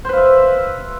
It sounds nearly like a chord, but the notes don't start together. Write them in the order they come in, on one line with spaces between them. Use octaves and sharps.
C5 B4 F5 E5